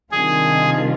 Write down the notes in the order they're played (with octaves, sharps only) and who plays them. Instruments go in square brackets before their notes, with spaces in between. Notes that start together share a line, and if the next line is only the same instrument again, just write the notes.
[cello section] C3 D#3 G3 D4 F4 [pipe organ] G#4